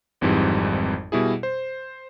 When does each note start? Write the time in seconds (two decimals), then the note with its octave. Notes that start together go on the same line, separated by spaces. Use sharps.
0.21 G#1 F2 G#2 E3 G3
1.12 B2 G3 E4 G#4
1.43 C5